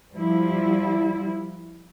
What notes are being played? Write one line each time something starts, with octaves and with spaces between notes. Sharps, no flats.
F3 G3 E4